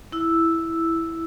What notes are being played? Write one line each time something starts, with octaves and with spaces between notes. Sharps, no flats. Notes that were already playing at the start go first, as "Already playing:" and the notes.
E4 E6